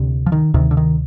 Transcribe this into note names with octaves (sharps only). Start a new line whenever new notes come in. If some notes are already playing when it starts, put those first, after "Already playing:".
Already playing: D2 C3
F3
D#3
D2 C3 D#3
D3
D#3